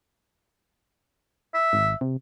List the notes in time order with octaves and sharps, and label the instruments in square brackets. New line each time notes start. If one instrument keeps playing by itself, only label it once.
[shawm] E5
[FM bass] G#1
C3